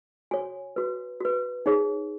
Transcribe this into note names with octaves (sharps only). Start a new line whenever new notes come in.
F#4 C#5 G#5
F#4 B4
F#4 B4
D#4 G#4 C#5